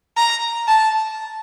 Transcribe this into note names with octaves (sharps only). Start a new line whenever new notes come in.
A#5
A5